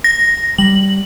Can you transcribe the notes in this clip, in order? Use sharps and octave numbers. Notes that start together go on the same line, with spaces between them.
A#6
G3 F#7